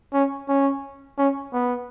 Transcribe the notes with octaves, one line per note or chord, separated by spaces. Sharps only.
C#4
C#4
C#4
B3